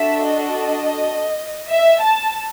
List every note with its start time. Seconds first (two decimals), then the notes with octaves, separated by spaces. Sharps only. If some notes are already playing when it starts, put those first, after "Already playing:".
Already playing: D4 F#4 A4 E5
0.27 D#5
1.69 E5
2.01 A5